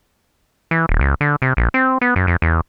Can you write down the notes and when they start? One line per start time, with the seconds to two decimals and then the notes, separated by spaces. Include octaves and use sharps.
0.71 E3
0.89 D#1
1.00 C#2
1.21 D3
1.42 C3
1.57 A#1
1.74 C4
2.01 B3
2.16 F#2
2.27 F2
2.42 E2